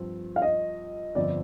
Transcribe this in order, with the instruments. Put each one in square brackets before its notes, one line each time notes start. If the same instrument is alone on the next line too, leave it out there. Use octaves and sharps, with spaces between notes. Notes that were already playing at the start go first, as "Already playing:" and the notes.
Already playing: [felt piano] G2 F3 C4
[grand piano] F5
D#5
[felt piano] G1 F2 D3 F3 C4 [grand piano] D5